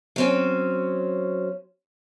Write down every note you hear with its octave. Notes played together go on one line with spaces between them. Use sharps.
F#3 C4 C#4